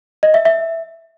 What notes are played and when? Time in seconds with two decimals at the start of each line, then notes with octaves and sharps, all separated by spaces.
0.23 D#5
0.34 E5
0.45 E5